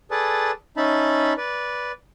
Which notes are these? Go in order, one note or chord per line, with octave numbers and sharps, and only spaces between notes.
G#4 A4 B4 D5 A5
C#4 D#4 E5 A5 B5
B4 D5